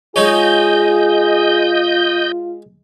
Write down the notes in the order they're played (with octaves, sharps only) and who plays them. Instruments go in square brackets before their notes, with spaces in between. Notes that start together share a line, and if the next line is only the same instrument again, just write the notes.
[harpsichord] G#3 D#4 C#5 [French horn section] F4 [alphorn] G#4 [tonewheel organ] D#5 G6